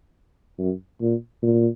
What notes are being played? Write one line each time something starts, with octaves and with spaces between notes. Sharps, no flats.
F#2
A#2
A#2